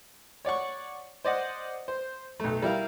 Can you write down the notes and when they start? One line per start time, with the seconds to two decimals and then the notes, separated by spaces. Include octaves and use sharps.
0.45 C#5 D5 F#5 C#6
1.25 C5 D5 D#5 F#5
1.88 C5
2.40 B1 A3
2.62 G3 E4 A#4 F5